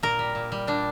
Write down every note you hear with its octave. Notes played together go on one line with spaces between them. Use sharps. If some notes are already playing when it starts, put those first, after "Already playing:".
A#2 A#4
G3
A#2
G3
A#2 D4